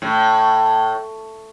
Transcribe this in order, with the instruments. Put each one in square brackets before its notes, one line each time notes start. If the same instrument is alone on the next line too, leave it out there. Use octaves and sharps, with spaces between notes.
[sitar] A2